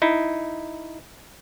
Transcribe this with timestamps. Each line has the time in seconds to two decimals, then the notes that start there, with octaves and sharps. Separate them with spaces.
0.02 D#4 E4